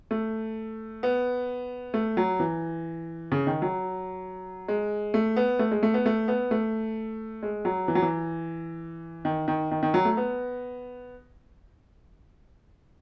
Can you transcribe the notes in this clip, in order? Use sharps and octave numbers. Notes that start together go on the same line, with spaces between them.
A3
B3
A3
F#3
E3
C#3
D#3
F#3
G#3
A3
B3
A3
G#3
A3
B3
A3
B3
A3
G#3
F#3
E3
F#3
E3
D#3
D#3
D#3
D#3
F#3
A3
B3